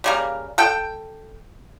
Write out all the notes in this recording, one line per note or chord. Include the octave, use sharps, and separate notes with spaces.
C#3 G3 A#3
A4 G5